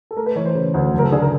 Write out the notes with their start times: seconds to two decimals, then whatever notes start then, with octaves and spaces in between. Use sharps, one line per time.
0.11 A4
0.17 A3 A#4
0.26 B4
0.36 E3 C#5
0.45 C5
0.55 C#3
0.74 D2
0.93 F#1
0.99 A#4
1.03 A4
1.12 D3 G#4
1.22 A#4